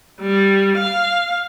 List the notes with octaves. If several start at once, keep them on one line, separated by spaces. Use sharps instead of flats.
G3
F5